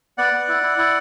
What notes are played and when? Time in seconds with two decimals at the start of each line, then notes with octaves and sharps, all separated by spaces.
0.18 B3 D5 F#5
0.33 B3
0.48 E4
0.63 E4
0.78 E4